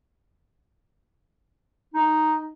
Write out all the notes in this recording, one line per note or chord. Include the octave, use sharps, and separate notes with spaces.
D#4